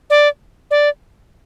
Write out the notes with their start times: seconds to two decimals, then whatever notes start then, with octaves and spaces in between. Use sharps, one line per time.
0.10 D5
0.71 D5